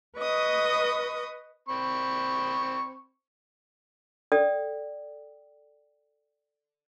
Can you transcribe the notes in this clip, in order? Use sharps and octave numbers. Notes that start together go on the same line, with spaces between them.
B4 D#5 C#6 D#6
C4 B5 C#6
A4 D5 G5 D#6